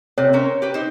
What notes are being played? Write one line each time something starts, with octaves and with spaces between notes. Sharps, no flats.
C3 C#5
C#4 A#4 C5
G4 B4 G5
D#4 C5